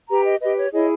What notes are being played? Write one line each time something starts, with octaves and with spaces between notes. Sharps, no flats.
G4 B4 A#5
D#5
G4 B4 D#5
C#5
E4 G#4 C#5 D#5